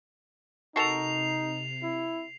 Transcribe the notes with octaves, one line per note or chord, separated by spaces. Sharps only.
C3 D#4 F#4 A4 A#4 C7 F7
E4